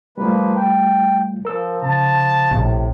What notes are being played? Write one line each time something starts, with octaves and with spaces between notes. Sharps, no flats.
F3 G3 A3 A#3 F4 B4
G5
F3 A#4 E6
C#3 A5
A#1 A2 C3